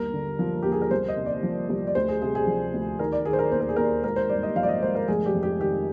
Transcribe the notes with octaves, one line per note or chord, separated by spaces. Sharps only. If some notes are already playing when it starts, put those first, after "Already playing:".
Already playing: G1 D#2 A#4
D3
F3
D#2 G4
G#4
A#4
C2 C5
D#5
C3
D5
F3
C2
D5
D2 C5
G#4
C3 G#4
G#4
F3
D2
D#3 A#4
D5
D#3 G#4
C5
A#4
D#2 C5
A#4
G#4
D#2 A#4
G#1 A#4
C5
G2 D5
D#5
F3 F5
D5
D#5
G#1 C5
A#4
F1 G#4
G4
F2
G4
D#3 G4